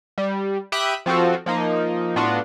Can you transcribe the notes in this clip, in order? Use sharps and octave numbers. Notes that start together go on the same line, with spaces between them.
G3
G4 E5 G5 B5 D#6 F#6
F3 C4 F4 F#4 A4
F3 A#3 D#4
A2 B3 D4 F4 F#4